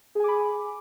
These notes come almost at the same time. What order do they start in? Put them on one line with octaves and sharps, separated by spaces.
G#4 G#5 D6 B5